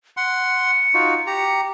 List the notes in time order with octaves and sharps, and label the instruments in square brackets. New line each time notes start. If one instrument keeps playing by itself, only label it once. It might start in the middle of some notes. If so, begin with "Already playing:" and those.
[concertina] F#5 C6 [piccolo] C#7
[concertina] D#4 F4 F#4
G4 A#5